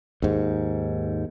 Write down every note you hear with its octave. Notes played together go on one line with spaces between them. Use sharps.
D#2 G#2